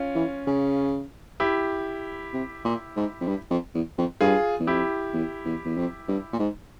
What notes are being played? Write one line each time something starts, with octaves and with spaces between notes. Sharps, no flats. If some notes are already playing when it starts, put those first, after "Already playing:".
Already playing: C#4 F4
E3
C#3
E4 G4
C3
A#2
G#2
F2
G2
F2
E2
F2
G2 F4 G#4
E2
F2 E4 G4
E2
E2
E2
F2
G2
A#2
G#2